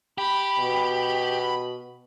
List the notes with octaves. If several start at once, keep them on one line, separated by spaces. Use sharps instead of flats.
G4 B5
B2